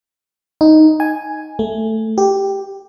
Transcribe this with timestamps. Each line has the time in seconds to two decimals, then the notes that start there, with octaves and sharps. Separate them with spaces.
0.61 D#4
1.00 G#5
1.59 A3
2.18 G4